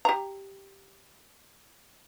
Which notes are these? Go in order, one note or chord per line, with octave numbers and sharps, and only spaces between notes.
G4 A#5